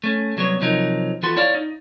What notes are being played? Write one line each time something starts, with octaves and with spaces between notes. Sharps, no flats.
A3 C#4
C2 F#3 B3 C#5
C3 F3 F#3 D#4 A#4
E3 B3 F4 F#4 A4 C6
E4 C#5 D5 F5
D#4